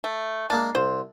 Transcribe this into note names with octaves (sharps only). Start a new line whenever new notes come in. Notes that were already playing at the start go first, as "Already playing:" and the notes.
A3
G#3 A#3 D4 A5
C2 C5